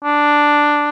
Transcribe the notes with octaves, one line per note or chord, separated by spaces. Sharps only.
D4